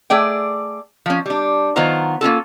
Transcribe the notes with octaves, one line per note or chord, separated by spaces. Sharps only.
A3 G#4 D5 G5
F3 C#4
G3 D4
D#3 F#3 B3 F4 C5 A#5
A#3 C#4 F4 A4